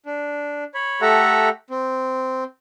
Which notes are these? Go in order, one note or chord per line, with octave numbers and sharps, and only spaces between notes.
D4
C#5 B5
A3 G4 A4 E5 F#5 A#5
C4